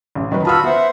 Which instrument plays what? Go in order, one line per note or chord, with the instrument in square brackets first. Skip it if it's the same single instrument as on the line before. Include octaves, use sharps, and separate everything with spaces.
[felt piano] A1
D#3 F#3 B4
[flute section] F4 F#4 B5 [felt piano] A5 D#6 E6
[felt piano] B3 [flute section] C5 E5 F#5